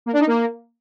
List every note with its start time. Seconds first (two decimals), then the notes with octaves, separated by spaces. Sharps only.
0.06 A#3
0.13 D4
0.20 D#4
0.27 A#3